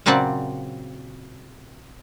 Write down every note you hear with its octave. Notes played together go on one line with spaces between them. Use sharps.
A#2 C#3 F#3 C4 D5 F#5